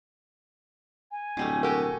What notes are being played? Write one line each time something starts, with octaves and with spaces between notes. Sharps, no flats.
G#5
D1 B2 G3 A3
F#4 G4 A4 A#4 G5